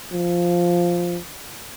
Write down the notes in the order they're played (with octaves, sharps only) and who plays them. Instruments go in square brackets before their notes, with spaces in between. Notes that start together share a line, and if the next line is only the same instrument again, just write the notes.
[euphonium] F3